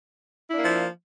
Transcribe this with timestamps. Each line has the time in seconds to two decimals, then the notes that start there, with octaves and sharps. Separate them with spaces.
0.49 E4
0.54 D4
0.58 A#3
0.63 F3